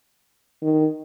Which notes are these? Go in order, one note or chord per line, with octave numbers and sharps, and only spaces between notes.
D#3